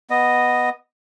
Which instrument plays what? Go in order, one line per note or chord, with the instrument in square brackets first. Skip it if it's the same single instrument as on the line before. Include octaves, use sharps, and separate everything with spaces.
[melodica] B3 D#5